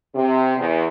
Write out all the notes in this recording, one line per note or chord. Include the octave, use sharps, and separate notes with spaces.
C3
E2